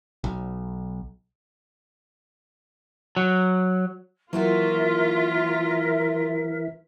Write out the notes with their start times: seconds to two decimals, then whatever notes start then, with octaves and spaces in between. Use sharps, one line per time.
0.24 B1
3.17 F#3
4.33 E3 F#3 A#3 F4 F#4 A#4 E5